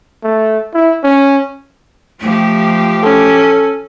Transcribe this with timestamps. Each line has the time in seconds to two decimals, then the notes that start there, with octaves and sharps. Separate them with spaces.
0.24 A3
0.74 E4
1.04 C#4
2.21 F3 A3 G4
3.03 C#4 A4